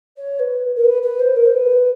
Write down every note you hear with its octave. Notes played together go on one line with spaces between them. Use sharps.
C#5
B4
A#4
B4
B4
C5
A#4
C5
B4